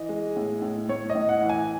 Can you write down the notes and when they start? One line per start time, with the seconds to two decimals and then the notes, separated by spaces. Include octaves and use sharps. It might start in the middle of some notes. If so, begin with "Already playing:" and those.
Already playing: E3 D#5
0.09 G#3
0.36 A2
0.62 A2
0.89 A2 C#5
1.10 D#5
1.15 A2
1.29 F#5
1.42 E3
1.49 G#5